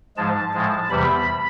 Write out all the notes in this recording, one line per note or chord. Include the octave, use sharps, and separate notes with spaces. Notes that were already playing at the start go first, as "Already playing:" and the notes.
G#2 F3 G#3 A5
A2 F3 G#3
E2 C3 E3 G3 B5